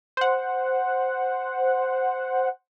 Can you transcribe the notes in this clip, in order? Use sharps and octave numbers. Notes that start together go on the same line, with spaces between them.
C5 F#5